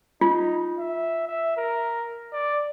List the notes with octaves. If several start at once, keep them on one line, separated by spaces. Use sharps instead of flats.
D#4 F4
E5
E5
A#4
D5